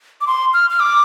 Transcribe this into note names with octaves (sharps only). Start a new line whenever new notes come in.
D6
C6
F6
F6
D6